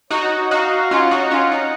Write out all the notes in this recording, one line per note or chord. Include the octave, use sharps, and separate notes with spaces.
D#4 F#4 C#5
D#4 F#4 F5
C#4 F4 F#5
D#4 F#4
C#4 F4
D#4